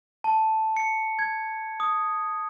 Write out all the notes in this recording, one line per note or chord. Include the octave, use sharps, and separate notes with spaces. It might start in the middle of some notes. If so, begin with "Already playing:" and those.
A5
C#7
G#6
D#6